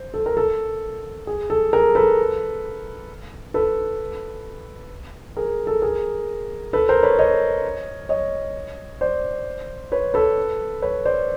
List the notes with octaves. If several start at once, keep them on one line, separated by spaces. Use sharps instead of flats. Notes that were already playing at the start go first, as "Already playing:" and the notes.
Already playing: C5
A4
A#4
A4
G#4
A4
G#4 A#4
A4 B4
A4 B4
G#4 A#4
A4
G#4 A#4
A4 B4
A#4 C5
B4 C#5
C#5 D#5
C#5 D#5
C5 D5
B4 C#5
A4 B4
B4 C#5
C5 D5